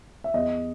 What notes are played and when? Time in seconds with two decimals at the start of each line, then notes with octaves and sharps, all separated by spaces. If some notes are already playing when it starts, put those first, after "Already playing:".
0.24 E5
0.34 E2 D#5